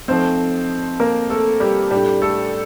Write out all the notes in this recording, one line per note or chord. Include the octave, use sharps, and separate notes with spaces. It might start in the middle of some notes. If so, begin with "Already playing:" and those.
F3 A3 C4 D#4 C5
A#3 A#4
A3 A4
G3 G4
A2 G3 A3 D4 G4
A3 A4